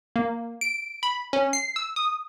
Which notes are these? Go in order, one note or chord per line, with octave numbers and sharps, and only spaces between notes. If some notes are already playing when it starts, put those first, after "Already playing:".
A#3
D7
B5
C#4
C7
E6
D#6